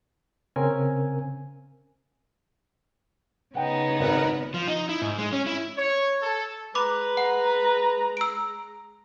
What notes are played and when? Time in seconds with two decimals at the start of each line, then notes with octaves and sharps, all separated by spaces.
0.56 C#3 C4 C#4 A#4 G#5
3.55 C#3 B3 D#4 F#5 G5
4.00 G#1 A#4 B4 F#5
4.54 F3
4.68 D#4
4.89 E4
5.02 G#2
5.18 G#3
5.33 C#4
5.47 E4
5.77 C#5
6.22 A4
6.75 G#3 B4 A#5 B5 D6
7.17 F#5
8.17 E6 D7